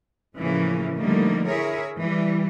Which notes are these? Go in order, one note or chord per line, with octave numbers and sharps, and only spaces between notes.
A2 C#3 E3 F3 A#3
D3 F3 G3 A3 A#3 D#4
E4 G#4 A#4 C#5 E5
E3 G3